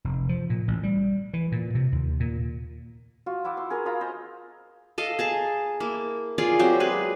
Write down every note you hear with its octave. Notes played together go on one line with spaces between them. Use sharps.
F1
F3
A#2
A1
G3
E3
A#2
C3
D#2
A#2
F4 F#4
E4 E5 F#5 D6
C6
G#4 A#4 G#5 C6
F4 A#5 B5 D#6
C5 D#5
A4 D#5 F5
G#4 A5 A#5
A#3 E4
F4 G#4 D5 F5
F#3 C4 G4
G#3 G#4 B4